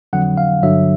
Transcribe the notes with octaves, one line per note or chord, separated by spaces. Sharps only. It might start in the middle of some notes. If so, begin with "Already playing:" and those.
F2 D3 F#3 F#5
F5
G2 D3 F#3 E5